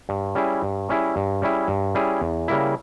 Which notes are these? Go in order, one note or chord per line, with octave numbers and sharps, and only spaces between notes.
G2
G3 C#4 E4 G#4
G2
G3 C#4 E4 G#4
G2
G3 C#4 E4 G#4
G2
G3 C#4 E4 G#4
E2
C#3 G3 A#3 E4